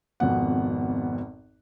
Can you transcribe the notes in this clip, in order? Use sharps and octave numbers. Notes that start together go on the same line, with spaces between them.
G#1 F2 B2 F#5